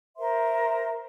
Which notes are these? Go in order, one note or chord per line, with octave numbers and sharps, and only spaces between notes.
A#4 C5 E5 C6